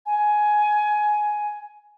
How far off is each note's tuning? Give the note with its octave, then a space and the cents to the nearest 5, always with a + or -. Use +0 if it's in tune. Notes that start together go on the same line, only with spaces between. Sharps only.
G#5 +15